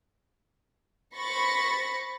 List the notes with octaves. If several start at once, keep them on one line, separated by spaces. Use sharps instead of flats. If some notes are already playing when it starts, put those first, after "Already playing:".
C5 B5 C#6 A6 A#6